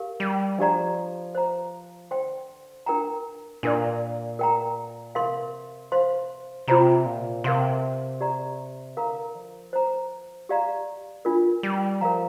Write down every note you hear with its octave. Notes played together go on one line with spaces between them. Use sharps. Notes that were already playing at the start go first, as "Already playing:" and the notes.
Already playing: G4 A#4 F5
G3
F3 D4 G4 D5 A#5
C5 A#5
D3 C5 G5 C6
D4 A#4 G5 A#5
A#2 D4 A#4 D5
A#4 G5 A#5
C3 A#4 F5 C6
C5 F5 C6
C3 F4 C5 A#5
A#2
C3 A#4 F5 C6
G4 D5 A#5
D3 A#4 F5 A#5
F3
C5 A#5
G4 D5 F5 A#5
G3 D4 F4 A#4
G3
F3 A#4 F5 A#5